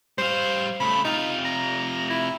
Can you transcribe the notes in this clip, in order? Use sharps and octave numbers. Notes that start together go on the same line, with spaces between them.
G3 C5 F5
C#3 A3 B5
C3 D#4 F4
A#5
E4